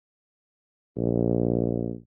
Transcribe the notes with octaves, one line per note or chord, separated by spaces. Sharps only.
A#1